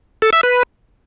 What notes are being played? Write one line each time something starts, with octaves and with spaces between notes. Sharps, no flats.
A4
E5
B4